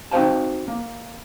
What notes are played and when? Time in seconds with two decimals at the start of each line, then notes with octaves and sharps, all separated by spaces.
0.11 C4 D#4 F#4 C5 F5 A5
0.68 A#3